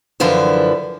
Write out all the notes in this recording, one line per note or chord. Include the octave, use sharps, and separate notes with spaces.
F#2 D3 E3 F3 B4 C5